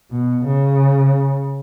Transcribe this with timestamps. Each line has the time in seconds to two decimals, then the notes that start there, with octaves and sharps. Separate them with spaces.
0.11 B2
0.45 C#3